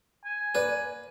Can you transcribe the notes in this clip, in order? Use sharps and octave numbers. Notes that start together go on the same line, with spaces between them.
G#5
A#3 B4 D5